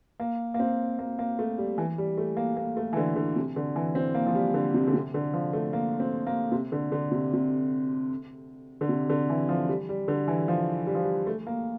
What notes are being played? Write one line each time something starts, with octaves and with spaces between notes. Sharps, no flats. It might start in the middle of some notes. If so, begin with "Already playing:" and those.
A#3
A#3
C4
A#3
A#3
A3
G3
E3
G3
A3
A#3
A#3
A3
E3
D3
D3
C3
D3
E3
C4
A#3
F3
G3
D3
C3
D3
C3
D3
F3
A3
A#3
C4
A#3
C3
D3
D3
C3
C3
D3
C3
D3
E3
F3
G3
G3
D3
E3
F3
G3
F3
G3
A3
A#3